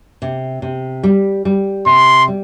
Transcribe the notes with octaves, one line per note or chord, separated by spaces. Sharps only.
C3
C3
G3
G3
C3 C6
G3